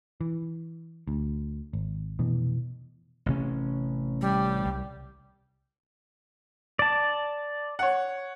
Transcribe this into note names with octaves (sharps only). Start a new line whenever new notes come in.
E3
D2
G#1
F1 B2 E3 B3
A1 C3 C#4
G3
C2
D5 A5
C#5 F#5